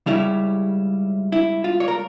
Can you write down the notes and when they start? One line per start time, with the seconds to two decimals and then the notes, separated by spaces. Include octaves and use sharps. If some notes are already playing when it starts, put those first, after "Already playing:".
0.06 C#2 C#3 G3 C#4 E4
1.32 E4
1.64 F4
1.80 C#5
1.88 A#4